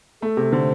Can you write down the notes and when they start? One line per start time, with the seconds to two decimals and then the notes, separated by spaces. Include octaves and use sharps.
0.22 A3 A4
0.37 C3
0.52 D3 C5